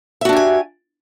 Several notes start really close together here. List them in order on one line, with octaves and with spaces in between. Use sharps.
E5 F#4 D4 G4 G#5